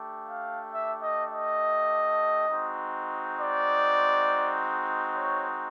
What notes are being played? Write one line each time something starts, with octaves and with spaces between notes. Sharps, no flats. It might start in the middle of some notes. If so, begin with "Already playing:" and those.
Already playing: A3 D4 G4
F5
E5
D#5
D#5
G#3 C4 D#4 F#4
D5
C#5